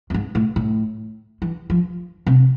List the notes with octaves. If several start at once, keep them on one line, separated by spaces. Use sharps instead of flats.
F2
G#2
A2
A2
E3
F3
C3